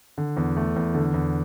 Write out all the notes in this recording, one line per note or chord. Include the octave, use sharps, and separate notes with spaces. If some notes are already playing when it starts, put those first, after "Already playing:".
D3
E2
A3
E2
D3
E2